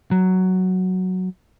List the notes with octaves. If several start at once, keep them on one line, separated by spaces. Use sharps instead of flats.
F#3